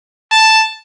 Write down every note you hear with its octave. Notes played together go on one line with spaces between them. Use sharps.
A5